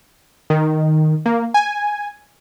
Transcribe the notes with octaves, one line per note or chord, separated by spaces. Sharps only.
D#3
A#3
G#5